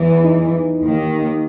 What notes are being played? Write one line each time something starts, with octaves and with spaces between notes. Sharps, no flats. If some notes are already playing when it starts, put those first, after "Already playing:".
Already playing: E2 E3
D#4
D#2 D#3